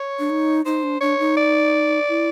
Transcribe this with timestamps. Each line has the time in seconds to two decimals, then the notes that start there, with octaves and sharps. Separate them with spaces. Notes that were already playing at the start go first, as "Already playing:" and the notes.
Already playing: C#5
0.19 D4
0.30 D#4
0.65 D#4 C5
0.83 D4
1.01 D4 C#5
1.19 D#4
1.37 D5
2.09 E4